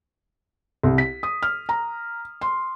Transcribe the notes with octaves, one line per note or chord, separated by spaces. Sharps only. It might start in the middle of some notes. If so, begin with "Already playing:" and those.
C2
B6
D#6
F6
A#5
C6